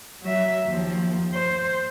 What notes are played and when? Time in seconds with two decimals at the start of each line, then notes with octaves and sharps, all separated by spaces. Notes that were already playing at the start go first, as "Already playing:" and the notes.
0.23 F#3 E5
0.66 D#2 F3
1.33 C5